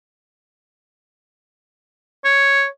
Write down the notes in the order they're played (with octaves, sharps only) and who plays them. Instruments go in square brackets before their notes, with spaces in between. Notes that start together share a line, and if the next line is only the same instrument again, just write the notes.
[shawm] C#5